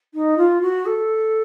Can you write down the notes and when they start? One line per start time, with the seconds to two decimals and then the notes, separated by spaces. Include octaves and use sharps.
0.14 D#4
0.37 F4
0.61 F#4
0.85 A4